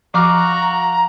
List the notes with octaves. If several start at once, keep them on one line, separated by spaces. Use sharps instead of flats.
F3 F#4 F5 A#5 D6 F6